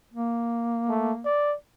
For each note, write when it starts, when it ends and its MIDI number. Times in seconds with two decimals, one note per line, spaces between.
0.13 1.25 58
0.89 1.13 57
1.25 1.55 74